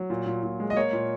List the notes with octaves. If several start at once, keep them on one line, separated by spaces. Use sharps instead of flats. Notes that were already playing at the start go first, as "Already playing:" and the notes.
Already playing: F#3
A#2
A#2
A#2
G#3
D#5
A#3 C#5
A#2